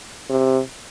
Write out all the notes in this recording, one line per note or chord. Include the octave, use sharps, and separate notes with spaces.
C3